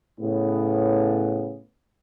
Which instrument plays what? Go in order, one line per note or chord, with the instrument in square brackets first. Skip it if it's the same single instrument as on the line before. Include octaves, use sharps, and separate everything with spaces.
[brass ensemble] A2 C#3 B3